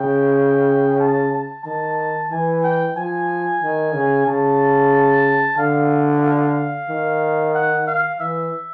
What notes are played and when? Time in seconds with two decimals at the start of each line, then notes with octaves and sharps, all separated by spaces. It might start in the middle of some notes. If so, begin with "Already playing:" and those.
Already playing: C#3 G5
1.00 A5
1.33 A5
1.65 D#3 A5
2.31 E3 G#5
2.63 G5
2.97 F3 G#5
3.62 D#3
3.94 C#3
4.27 C#3 A5
5.58 D3 F5
6.23 F5
6.89 D#3
7.54 F#5
7.87 F5
8.19 E3 E5